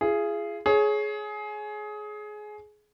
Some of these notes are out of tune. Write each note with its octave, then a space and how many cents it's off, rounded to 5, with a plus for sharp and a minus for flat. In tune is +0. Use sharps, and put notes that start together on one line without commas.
F4 -40 G#4 +0
G#4 +20 C#5 +0